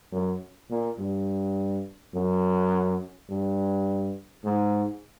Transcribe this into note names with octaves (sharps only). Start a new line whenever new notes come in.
F#2
A#2
G2
F#2
G2
G#2